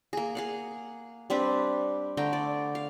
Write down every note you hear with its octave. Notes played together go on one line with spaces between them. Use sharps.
A#3 G#4
G#4 F5 F#5
G3 C4 D4 B4
D3 A3 G5 A#5
D5
F5